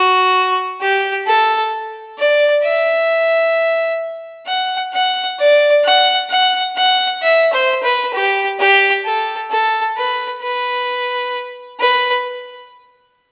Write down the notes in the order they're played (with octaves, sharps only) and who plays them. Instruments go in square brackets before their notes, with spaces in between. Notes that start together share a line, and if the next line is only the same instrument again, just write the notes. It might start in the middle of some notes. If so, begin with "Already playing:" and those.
Already playing: [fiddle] F#4
G4
A4
D5
E5
F#5
F#5
D5
F#5
F#5
F#5
E5
C5
B4
G4
G4
A4
A4
B4
B4
B4